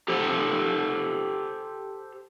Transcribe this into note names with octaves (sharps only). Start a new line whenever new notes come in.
G4 A4 C5